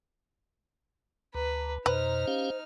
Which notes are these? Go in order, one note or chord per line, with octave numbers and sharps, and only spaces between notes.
D2 B4 A#5
F2 B2 D#4 B4 C5 A#5 F6
C#4 G4 F5